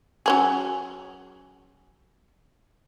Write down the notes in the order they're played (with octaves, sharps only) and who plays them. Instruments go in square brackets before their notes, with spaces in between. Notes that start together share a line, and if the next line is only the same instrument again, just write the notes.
[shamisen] F#3 C#4 G#4